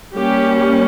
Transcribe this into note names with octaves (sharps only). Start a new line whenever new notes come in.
G3 A#3 C#4 G4